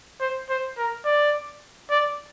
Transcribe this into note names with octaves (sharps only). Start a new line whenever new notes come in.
C5
C5
A#4
D5
D5